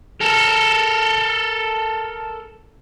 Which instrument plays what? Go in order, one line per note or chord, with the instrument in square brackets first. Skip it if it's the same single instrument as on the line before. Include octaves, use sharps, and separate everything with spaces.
[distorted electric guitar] A4 A#4